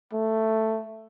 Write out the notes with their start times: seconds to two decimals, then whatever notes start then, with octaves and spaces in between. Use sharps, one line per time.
0.13 A3